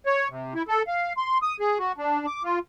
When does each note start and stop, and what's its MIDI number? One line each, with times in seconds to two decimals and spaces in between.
0.06 0.28 73
0.29 0.54 48
0.54 0.63 64
0.68 0.83 69
0.87 1.13 77
1.17 1.38 84
1.42 1.56 87
1.60 1.78 68
1.79 1.92 66
1.98 2.26 62
2.26 2.43 86
2.44 2.59 65